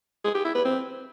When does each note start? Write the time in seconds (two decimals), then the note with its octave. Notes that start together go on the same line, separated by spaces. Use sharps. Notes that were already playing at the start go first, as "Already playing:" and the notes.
0.24 G#4
0.34 G4
0.45 E4
0.55 B4
0.65 C4